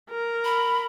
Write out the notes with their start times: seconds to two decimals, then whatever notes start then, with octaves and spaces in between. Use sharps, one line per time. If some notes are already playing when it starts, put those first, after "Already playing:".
0.10 A#4
0.44 B5